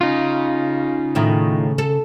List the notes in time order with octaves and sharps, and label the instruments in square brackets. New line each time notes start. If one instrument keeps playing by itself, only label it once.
[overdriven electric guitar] C#3 [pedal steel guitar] D#4 F4
[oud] A2 D#3 E4
A4